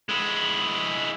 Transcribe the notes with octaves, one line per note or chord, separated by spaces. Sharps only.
G#3 E4